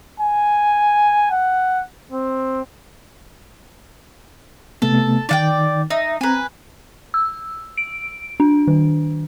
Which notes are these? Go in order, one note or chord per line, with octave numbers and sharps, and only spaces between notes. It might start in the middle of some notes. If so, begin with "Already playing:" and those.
G#5
F#5
C4
C3 A3 B3 A4
D#3 D#4 D5 F#5 G5
D#4 E5
C4 B4 G#5 A#5
E6
D7
D4
D#3